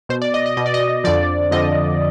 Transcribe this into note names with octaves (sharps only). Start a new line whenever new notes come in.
B2 C5
D5
D#5
D#5
B2 D#5
D5
D#5
F2 D3 F3 D5
F2 D3 F3 D#5